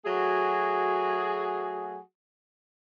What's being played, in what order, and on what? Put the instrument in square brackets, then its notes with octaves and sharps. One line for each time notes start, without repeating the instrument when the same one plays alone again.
[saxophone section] F#3 A3 F#4 G#4